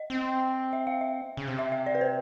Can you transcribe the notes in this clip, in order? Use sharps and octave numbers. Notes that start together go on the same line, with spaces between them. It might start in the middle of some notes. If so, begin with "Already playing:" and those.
Already playing: D#5
C4
E5
F5
E5
C#3
C3
E5
E5
D5
B4
C5